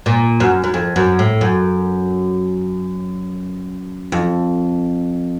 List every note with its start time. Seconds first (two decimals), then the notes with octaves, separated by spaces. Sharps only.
0.06 A#2
0.40 F#2
0.64 F#2
0.74 F2
0.96 F#2
1.19 A2
1.41 F#2
4.12 F2